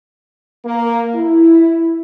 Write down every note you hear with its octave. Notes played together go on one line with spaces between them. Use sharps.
A#3
E4